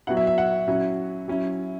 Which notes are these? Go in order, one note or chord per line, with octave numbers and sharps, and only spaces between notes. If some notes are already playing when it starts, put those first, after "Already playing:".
F#3 B3 E4 F#5
E5
E5
F#5
F#3 C#4 E4
F#3 C#4 E4